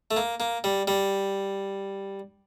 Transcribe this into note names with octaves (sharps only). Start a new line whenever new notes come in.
A3
A#3
A#3
G3
G3